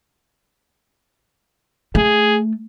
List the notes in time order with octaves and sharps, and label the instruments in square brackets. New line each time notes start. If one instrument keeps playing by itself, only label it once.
[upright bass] A3 [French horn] G#4